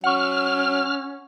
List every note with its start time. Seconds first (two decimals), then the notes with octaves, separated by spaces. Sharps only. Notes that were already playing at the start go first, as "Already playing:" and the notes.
0.04 F#3 C#4 F#5 C#6 F6